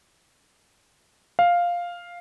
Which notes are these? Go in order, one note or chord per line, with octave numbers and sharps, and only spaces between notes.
F5